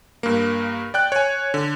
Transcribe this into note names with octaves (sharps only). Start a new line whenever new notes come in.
G2 A#3
D5 G5 F#6
C#5 G#5
D3